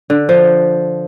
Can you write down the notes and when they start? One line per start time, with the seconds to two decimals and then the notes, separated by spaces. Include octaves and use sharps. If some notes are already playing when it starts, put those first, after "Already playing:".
0.10 D3
0.29 F3